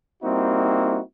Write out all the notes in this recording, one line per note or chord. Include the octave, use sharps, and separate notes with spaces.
G3 A#3 C4 D#4 E4 F#4